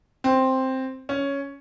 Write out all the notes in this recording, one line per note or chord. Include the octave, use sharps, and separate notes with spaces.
C4
C#4